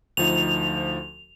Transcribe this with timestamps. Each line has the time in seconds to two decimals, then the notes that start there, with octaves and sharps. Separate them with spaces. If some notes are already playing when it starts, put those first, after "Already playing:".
0.17 D2 F3 D#4 F7